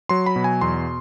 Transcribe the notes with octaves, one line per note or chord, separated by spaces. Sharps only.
F#3 C6
B5
B2
G#5
E2 C6